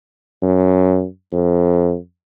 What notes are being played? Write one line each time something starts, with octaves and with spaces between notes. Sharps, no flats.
F#2
F2